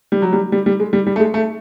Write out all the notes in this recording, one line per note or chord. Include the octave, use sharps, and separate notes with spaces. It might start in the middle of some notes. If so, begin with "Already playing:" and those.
G3
F#3
G3
G3
G3
G#3
G3
G3
A3
G#3
A3